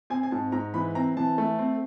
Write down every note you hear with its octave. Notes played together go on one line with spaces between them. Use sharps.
C4 G#5
G#5
G#2 A5
G#2 A#5
E3 B5
C4 A#5
E3 A5
A3
C4